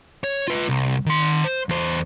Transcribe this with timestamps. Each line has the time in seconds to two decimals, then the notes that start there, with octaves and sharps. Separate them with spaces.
0.24 C#5
0.48 F4 B4
0.69 C2
1.06 D#3 C6
1.44 C5
1.69 E2 C5